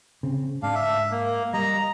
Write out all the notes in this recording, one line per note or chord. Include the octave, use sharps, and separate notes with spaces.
C#3 C4
G#2 D4 F5
E5
A#3
G3 D#5 A#5